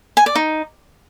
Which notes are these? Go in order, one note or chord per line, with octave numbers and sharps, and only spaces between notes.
G#5
D5
D#4